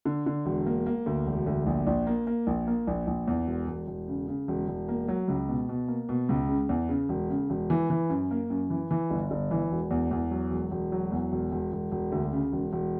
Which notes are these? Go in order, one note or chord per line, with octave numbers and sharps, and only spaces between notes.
D3
D3
E1
A#3
A#3
D2
E1
D2
A#1
A#1
A#3
A#3
A#1
A#3
A#1
A#1
E2
E1
E1
E1
C#3
C#3
E1
E1
A#3
F#3
C#2
B2
B2
A#3
B2
C#2
C#3
E2
C#3
E1
C#3
E1
E3
E3
F#2
A#3
F#2
E3
E3
G1
G1
E3
E1
E2
E2
F#3
E1
E1
F#3
E2
E1
E1
E1
E1
D2
C#3
E1
E1